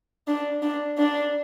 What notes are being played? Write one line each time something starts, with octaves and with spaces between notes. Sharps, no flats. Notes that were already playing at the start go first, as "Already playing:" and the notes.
D4
D4
D4